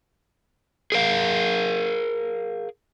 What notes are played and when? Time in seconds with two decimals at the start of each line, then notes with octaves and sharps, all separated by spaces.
0.92 G#4 A#4 F5